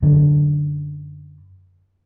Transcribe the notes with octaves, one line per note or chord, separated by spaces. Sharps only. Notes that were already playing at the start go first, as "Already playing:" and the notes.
F#2 D3